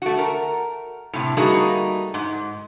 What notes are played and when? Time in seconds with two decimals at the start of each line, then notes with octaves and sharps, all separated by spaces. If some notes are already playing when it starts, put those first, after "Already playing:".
0.02 A3 F#4
0.18 A#4
1.13 A2 C3
1.37 G3 A3 A#3 D#4 F#4 G#4
2.14 G#2